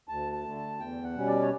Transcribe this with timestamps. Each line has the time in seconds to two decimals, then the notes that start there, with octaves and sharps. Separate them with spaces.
0.08 D2 A5
0.32 A5
0.44 D3 A3
0.56 A5
0.79 E2 G5
1.03 F#5
1.15 B2 G3 C#4
1.27 D5
1.42 C#5